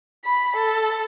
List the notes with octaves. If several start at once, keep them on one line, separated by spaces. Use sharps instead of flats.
B5
A4